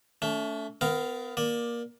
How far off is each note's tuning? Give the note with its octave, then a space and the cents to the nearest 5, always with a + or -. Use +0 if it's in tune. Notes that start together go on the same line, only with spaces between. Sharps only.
A3 +0 C#4 +40
B3 +30 A#4 +0 F5 +0
A#3 +20 D5 +10